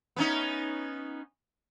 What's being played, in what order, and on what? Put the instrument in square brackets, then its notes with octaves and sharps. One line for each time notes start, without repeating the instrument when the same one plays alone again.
[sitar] B3 C#4 D#4